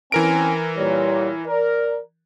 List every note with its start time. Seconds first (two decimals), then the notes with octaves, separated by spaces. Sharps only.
0.12 E3 C4 C#4 A#4 G#5 D7
0.77 A#2 G3 C#5
1.46 A#4 D5